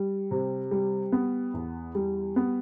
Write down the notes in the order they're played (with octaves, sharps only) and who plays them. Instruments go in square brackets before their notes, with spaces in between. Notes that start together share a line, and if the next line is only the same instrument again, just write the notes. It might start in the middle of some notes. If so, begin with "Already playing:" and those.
Already playing: [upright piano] G3
C3
G3
B3
E2
G3
B3